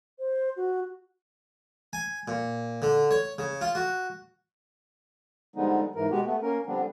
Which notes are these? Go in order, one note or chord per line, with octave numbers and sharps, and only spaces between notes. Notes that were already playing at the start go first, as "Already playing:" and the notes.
C5
F#4
G#5
A#2
D3
C#5
C#3
F4
F#4
D3 F3 G3 G#3 B3 D#4
G#2 E3 A#4
B2 G#3 B3 F#4 G4
A3 B3
A#3 C#4 A#4
D3 F3 G3 B3 C4 D4